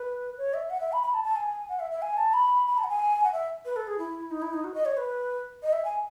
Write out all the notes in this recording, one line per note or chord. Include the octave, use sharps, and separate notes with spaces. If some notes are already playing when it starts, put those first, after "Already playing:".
Already playing: B4
C#5
E5
F#5
E5
B5
B5
A5
A5
G#5
F#5
E5
E5
G#5
A5
B5
B5
A5
F#5
G#5
F#5
E5
B4
A4
G#4
E4
D#4
E4
D#4
F#4
D#5
C#5
B4
D#5
E5
G#5